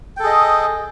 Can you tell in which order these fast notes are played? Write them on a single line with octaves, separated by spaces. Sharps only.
G5 A4 G#4 D#5